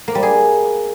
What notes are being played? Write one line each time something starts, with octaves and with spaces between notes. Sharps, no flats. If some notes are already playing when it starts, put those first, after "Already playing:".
A#3
G3
G#4